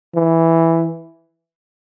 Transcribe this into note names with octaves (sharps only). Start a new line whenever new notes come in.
E3